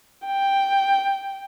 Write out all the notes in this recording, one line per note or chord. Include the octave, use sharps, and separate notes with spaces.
G5